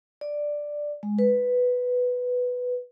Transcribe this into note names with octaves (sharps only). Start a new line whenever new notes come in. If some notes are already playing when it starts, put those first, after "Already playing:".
D5
G#3
B4